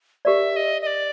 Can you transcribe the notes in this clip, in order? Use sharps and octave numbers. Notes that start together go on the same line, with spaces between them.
G4 A#4 D5 E5
D#5
D#5
D5